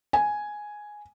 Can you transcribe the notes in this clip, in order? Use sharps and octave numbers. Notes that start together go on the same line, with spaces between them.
G#5